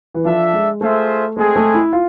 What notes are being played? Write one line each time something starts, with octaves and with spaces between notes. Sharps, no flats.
E3
F3 D4 A4 E5
G#3
A3 F4 G#4 C5 E5
G#3 A3 C4 G#4
A3
E4
F4